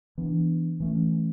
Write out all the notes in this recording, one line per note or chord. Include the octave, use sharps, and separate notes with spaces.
E3 B3 D4
E3 A3 C#4